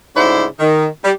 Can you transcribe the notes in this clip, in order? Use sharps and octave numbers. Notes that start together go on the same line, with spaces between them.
D2 G#2 C#3 E4 C5 D5
D#3
G3